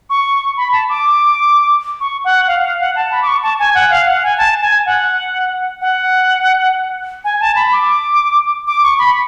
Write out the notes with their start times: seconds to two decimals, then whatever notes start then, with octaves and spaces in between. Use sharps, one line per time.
0.10 C#6
0.57 B5
0.73 A5
0.89 D6
2.00 C#6
2.24 F#5
2.48 F5
2.63 F5
2.80 F#5
2.96 A5
3.12 B5
3.22 D6
3.27 C#6
3.43 A5
3.59 G#5
3.75 F#5
3.90 F5
4.07 F#5
4.23 G#5
4.38 A5
4.62 G#5
4.86 F#5
5.81 F#5
7.24 G#5
7.41 A5
7.56 B5
7.72 D6
8.67 D6
8.83 C#6
8.99 B5